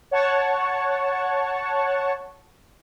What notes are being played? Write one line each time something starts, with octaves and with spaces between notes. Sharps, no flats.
C#5 F#5 A5 C#6